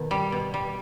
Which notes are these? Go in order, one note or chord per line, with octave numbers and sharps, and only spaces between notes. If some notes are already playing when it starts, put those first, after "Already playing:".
Already playing: B2 D#3
G3
B2
G3